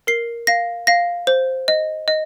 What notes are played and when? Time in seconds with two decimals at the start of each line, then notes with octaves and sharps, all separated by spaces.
0.07 A#4 C7
0.47 F5 A#6
0.87 F5 A#6
1.27 C5
1.68 D#5
2.08 D#5